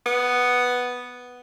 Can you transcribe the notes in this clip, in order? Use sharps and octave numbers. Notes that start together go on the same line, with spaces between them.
B3